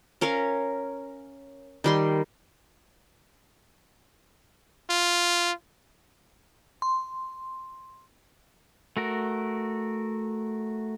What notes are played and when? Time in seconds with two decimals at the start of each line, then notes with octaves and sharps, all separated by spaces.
0.21 C#4 A#4 C#5 F5
1.84 D#3 G3 C6
4.90 F4
6.82 C6
8.97 A3 F#4 A#4